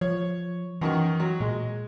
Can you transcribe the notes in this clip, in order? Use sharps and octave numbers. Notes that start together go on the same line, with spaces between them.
F3 C#5
F#2 D#3 E3 C#6
F#3
A#2 G#3